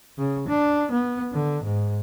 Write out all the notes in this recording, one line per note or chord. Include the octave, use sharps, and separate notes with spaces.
C#3
D4
B3
D3
G#2